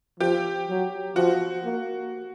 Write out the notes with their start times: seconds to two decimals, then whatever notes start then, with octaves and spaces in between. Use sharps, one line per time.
0.20 F3 G4
0.69 F#3
1.16 F3 F#4
1.64 A#3